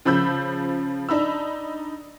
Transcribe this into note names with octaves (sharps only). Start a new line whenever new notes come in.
C#3 F3 B5 E6 G6
D4 D#4 B5 E6